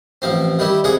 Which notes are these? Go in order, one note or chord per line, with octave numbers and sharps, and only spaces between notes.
A1 F3 C4
D#3 G3 E4
C2 G#3 G#4 F#5